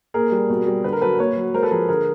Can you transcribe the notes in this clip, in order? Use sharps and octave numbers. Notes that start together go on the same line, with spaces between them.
A#2 G#4 A#4
G3
B2
G3
D3 B4
A#4
F#3 A4 B4
A#2 B4 C#5
F#3
G#3 A#4 C5
A4 B4
F3 G#4 A#4
D3 G#4 A#4